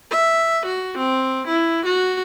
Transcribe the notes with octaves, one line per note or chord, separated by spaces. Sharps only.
E5
F#4
C4
E4
F#4